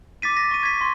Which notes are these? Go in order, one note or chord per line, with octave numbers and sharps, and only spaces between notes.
D6 A6 B6 D#7
A#6
C#6 D#7
G#6 B6
C6